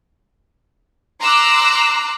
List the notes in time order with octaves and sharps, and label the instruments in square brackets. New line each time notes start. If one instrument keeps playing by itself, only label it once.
[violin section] A#5 C6 D6 E6 F#6